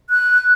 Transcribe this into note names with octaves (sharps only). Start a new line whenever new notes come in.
F#6